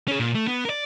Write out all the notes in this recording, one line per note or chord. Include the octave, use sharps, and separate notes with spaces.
C#4 G#4
A#2
A3
B3
A#4 D5